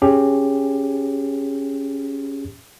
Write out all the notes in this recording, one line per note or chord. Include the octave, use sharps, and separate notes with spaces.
C#4 G4 G#4